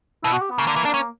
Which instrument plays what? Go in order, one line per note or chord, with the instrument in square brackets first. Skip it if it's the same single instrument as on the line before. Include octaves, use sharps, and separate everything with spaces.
[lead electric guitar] B2 [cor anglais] E4
[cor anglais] F#4
G4
B3
[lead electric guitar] C#3 [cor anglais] A#3
[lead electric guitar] D3
E3
D4
C#4